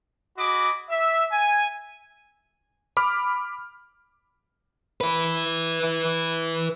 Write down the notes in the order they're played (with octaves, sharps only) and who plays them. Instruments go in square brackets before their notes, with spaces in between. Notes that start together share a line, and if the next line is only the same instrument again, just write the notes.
[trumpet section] F#4 G#4 D#5 B5 D6
E5
G#5
[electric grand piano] B5 D6 F6
[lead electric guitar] E4 B4